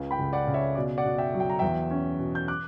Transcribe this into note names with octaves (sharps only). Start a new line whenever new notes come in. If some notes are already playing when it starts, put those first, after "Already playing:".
Already playing: C#2 C#3
G5 B5
C#2
D5 F#5
C#3
C#5 E5
B2 D5
D5 F#5
B2
E5 G5
F#3
G5
A#5
E2 E5 G5
C#4
B2
G6
D6 F#6